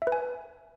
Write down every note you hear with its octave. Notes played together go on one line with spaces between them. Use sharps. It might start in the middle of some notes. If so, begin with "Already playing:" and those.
E5
B4
G#5